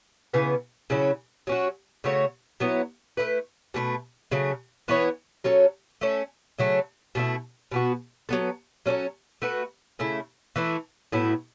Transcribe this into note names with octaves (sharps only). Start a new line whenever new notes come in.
C#3 E3 B3
C#3 F#3 C#4 E4
F#3 C#4 F#4
C#3 A3 F#4 C#5
F#3 B3 E4 C#5
A3 E4 B4
B2 A3 F#4 B4
C#3 F#3 A3
E3 B3 E4 C#5
F#3 C#4 A4 C#5
A3 C#4 A4
C#3 F#3 A3
B2 A3 E4
B2 B3 F#4
F#3 B3 A4
F#3 C#4 A4 C#5
A3 F#4 B4
C#3 A3 E4
E3 A3 E4
A2 F#3 B3 E4